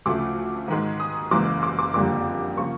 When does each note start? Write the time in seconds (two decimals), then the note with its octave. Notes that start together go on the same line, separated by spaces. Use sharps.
0.06 D2 C#3 F3 A3 D6
0.68 G#2 D#3 G#3
1.00 D#6
1.31 F#1 F#2 C#3 E3 G#3 D6
1.63 D6
1.79 D6
1.94 F#1 F2 D3 G3 A#3 D6
2.57 C#3 F3 A#3 C#6